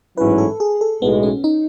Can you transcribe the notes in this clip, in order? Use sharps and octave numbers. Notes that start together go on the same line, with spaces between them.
A1 G#2 F#3 C#4 E4 B4
A4
G#4
A4
B1 A2 G#3 B3
C#4
D#4